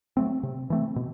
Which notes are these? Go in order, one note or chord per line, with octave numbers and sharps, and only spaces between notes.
F#3 A3 C4
C3
E3 A3 C4
B2